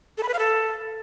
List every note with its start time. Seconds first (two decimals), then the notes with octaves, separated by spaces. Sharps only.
0.18 A4
0.23 B5
0.28 B4
0.34 F5
0.39 A4